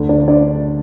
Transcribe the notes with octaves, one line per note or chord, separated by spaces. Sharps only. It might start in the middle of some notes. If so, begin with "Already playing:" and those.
Already playing: D2 D3
D4 D5
D4 D5